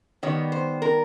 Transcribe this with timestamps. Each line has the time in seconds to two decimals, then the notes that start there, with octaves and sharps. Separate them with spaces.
0.23 D#3 G3 B3 C#5
0.52 C5
0.82 A#4